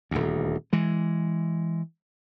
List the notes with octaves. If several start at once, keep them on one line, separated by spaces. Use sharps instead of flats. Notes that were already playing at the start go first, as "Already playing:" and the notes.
D#1 D2
E3 G#3